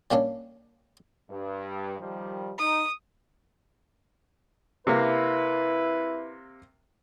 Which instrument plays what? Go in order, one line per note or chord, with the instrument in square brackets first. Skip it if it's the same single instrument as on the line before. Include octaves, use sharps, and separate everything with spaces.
[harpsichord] G3 A#3 C#4 D4
[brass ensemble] G2
D#3 F3 G3
[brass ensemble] D#4 [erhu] D#6
[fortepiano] C3 A#3 [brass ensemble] E4 B4